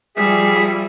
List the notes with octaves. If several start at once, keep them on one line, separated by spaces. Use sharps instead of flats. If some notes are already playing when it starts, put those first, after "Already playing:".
F3 G3 G#4 E5